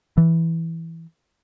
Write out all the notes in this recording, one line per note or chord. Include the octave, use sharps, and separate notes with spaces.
E3